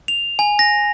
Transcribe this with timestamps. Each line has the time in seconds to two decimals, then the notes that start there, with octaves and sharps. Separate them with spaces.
0.08 F7
0.39 G#5
0.59 A#6